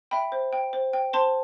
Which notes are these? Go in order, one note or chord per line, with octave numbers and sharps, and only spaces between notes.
E5 G5 B5
C5
G5
C5
G5
C5 A5 C6